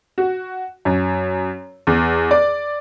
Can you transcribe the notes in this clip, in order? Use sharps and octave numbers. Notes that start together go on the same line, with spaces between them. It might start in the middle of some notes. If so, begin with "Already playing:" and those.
F#4
F#2
E2
D5